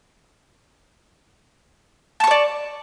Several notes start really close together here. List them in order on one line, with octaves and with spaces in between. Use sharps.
A5 C#6 C#5 D5